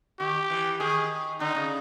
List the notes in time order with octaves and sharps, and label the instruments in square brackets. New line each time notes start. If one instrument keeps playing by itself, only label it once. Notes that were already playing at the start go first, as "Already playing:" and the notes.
[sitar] D#3 [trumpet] G4
[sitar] E3
[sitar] D#3 [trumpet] G#4
[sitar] D3 [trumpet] D#4
[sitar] C#3